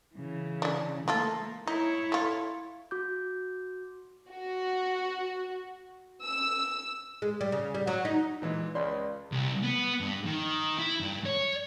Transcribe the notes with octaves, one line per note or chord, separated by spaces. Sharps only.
C#3 E3
C#4 D4
E3 A3 A#3 F4 A4
D#4 E4 C#5
A3 F4
F#4 D6 G6
F#4
E6
G#3
G3
C#3
G3
F#3
D#4
A#2 E3 G#3
C#2 D5 B5 C6
C2
B3
G2
D#3
E4
G2
C#5